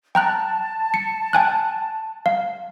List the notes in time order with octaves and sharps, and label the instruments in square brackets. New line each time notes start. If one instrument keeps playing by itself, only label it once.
[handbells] G5 A#5 F#6 [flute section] A5
[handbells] C#7
G5 G#5 F#6
F5